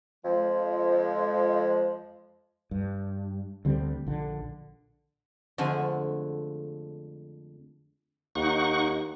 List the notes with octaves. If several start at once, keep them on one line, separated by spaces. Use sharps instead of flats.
F2 F3 G#3
G2
D2 D3 G3 C4
A#1 D3
F2 D3 G#3 A3 F#5 G#5
D#2 D#4 F#5 C#6